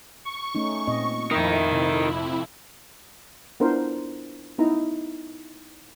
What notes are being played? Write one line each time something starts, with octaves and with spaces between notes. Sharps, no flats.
C#6
A3 C#4 D#4
A#2 C4 D#5
F2 D#4 E4 A#4
C3
B3 D4 E4 F4 A#4 C5
B3 D#4 E4 E5 A#5